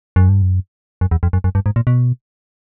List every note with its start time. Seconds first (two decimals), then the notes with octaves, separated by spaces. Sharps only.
0.16 F#2
0.29 G2
0.42 F#2
1.01 F#2
1.11 E2
1.23 F2
1.33 F#2
1.44 F#2
1.55 G2
1.66 G#2
1.76 A#2
1.87 B2